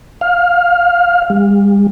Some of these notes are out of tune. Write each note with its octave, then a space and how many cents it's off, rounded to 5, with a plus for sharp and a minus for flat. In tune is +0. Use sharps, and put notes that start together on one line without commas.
F5 +15
G3 +45